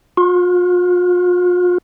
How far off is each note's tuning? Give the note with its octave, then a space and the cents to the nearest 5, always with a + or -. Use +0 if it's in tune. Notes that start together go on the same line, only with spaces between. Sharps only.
F4 +40